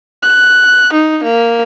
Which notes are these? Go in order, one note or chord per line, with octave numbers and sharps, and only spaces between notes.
F#6
D#4
A#3